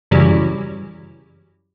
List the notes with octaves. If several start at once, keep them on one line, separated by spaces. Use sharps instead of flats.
F#2 C#3 E3 F#3 G3